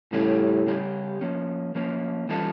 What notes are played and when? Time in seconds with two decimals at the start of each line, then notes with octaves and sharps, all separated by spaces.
0.13 A2 C#3 G3 C#4 G4
0.66 C#3 G3 C#4 G4
1.21 F3 A#3 C#4
1.75 F3 A#3 C#4
2.29 E3 G3 C#4 F4 A4